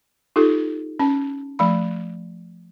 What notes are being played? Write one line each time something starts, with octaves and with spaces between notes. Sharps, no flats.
D#4 F4 G4 A4
C#4 A5
F3 A3 B5